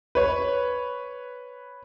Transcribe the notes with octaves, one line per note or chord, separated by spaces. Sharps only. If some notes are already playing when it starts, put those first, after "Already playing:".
B4 C#5